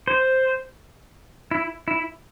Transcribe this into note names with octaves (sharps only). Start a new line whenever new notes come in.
C5
E4
E4